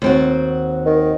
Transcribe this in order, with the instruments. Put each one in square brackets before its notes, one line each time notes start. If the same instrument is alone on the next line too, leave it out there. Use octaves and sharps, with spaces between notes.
[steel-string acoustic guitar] D#2 C4 F#4
[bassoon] D#3